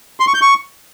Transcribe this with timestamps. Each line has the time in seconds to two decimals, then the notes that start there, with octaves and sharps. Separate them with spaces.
0.20 C6
0.27 C#6
0.34 G6
0.42 C#6